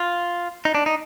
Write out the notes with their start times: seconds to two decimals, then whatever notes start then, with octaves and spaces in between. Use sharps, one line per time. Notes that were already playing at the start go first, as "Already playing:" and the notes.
Already playing: F4
0.65 D#4
0.75 D4
0.86 D#4